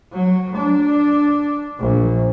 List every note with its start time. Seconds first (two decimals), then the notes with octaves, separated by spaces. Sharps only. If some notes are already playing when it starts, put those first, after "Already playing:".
0.12 F#3
0.55 D4
1.80 A#1